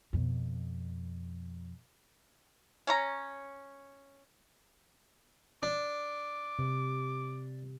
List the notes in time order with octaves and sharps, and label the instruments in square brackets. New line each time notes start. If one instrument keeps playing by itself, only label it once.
[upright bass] F2 B2
[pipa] C#4 C#5 A#5
[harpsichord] D4 [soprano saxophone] D6
[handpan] C3